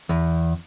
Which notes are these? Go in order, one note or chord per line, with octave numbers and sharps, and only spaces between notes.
E2